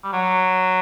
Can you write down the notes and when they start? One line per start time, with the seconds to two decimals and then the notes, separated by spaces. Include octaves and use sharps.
0.04 G3
0.13 F#3